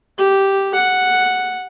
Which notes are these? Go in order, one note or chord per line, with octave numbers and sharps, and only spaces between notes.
G4
F#5